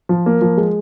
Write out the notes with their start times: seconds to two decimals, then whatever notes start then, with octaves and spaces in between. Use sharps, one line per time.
0.09 F3
0.26 A#3
0.41 F3
0.57 G#3